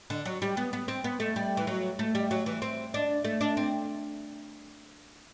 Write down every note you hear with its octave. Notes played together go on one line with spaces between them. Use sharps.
D3
F#3
G3
B3
B3
C4
B3
A3
G3
E3
F#3
A3
G3
F#3
E3
C4
D4
A3
D4
C4